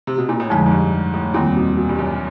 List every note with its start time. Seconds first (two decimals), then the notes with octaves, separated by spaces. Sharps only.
0.07 C3
0.18 B2
0.29 A#2
0.40 A2
0.50 F2 G#2 D3 F3 G#3
0.66 G#2
0.72 G2
1.13 A2
1.34 D#2 A#2 D#3 G3 C4
1.56 B2
1.77 B2
1.89 G2
1.99 F#2